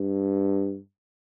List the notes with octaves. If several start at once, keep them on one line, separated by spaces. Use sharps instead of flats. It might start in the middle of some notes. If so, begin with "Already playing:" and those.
Already playing: G2